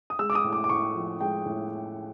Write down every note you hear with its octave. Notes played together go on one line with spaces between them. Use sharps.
D#6
G#3 E6
D6
D#6
A2
D6
D6
A2 C#6
F3
G#3 G5
A2